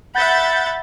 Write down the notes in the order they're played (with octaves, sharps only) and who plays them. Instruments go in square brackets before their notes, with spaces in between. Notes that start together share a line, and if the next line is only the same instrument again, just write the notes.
[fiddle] E5 B5 [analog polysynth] F#5 G6 A6